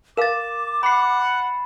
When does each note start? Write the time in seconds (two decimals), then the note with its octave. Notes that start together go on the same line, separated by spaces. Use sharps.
0.17 A#4 F5 D6 A6 E7
0.83 F#5 B5 C7